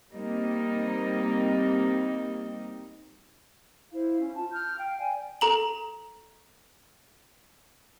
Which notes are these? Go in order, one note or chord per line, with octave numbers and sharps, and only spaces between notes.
G3 A#3 C4 D#4
E4 C5 F5
C#4
F4 A5
F6 G6
F5 G5
D5 G5 G#5
A4 A#5 F#7